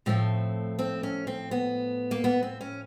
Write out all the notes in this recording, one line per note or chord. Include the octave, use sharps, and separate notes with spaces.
A2 F3 A3 C4
C4
C#4
C4
B3
A#3
B3
C4
C#4